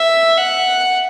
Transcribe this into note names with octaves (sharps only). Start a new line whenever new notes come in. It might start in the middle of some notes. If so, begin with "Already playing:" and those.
Already playing: E5
F#5